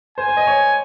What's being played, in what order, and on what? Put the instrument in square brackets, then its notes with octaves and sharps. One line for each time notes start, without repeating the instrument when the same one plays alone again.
[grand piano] C5 [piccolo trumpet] G#5
[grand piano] C5
D#5
C#5